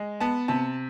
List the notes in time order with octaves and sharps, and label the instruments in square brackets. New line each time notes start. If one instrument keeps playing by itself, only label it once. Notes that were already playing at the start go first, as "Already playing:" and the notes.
Already playing: [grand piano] G#3
B3 A5
C3 A5